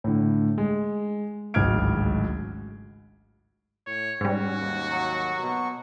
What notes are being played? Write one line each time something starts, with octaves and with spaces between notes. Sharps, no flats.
A2 D3
G#3
D1 G#1 C#2 F6 G#6 D7
A2 C#5
G#2 G3 C#4 F#4
D#2
F#3 C#6
B2